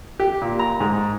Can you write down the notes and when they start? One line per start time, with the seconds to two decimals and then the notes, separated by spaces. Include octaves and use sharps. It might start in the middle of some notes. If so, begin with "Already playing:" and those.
0.20 G4
0.42 A#2
0.59 A#5
0.80 G#2